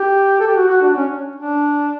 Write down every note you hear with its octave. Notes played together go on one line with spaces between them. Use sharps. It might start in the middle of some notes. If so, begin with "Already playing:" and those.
Already playing: G4
A4
G4
F#4
F#4
D4
C#4
D4